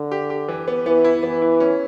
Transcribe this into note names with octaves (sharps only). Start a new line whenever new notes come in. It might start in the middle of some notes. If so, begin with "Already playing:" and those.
Already playing: D3
G4
G4
E3
B3
E3 B3
E4
E3 B3
E4
C#4